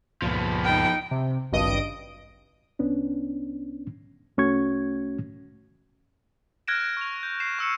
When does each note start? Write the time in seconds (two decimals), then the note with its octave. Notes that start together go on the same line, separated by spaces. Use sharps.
0.22 C#2 G2 A#2 F3 B3
0.65 D#4 G5
1.11 C3
1.52 G#1 C#2 G2 D#5 D#6 D7
2.79 C2 B3 C#4 D4
4.38 C2 A3 C#4 F#4 C#6 G#6
6.68 F6 F#6 G#6 A#6 D7 E7
6.97 C#6 F7
7.23 G6
7.40 C7 E7
7.59 C#6 E6 C#7 E7